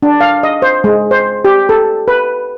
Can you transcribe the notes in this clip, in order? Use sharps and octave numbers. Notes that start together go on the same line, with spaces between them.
D4
F5
D#5
C5
G#3
C5
G4
A4
B4